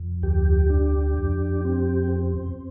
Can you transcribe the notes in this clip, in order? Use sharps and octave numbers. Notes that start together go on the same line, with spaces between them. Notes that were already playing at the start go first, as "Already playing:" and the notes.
Already playing: F2
D2 G4
D4
F2
C4